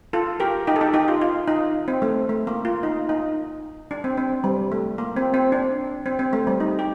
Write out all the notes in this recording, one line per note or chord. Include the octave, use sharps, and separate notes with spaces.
F4 A4
G4 A#4
D#4 G4
A4
D#4 G4
D#4 G4
F4
F4
D#4
C4
A3
A3
A#3
F4
D#4
D#4
D4
C4
C4
G3
A3
A#3
C4
C4
D4
C4
C4
A3
G3
D#4
G4